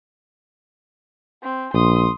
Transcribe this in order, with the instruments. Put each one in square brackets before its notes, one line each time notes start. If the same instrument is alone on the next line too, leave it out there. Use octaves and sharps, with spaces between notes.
[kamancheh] C4
[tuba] A#1 [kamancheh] C6 D#6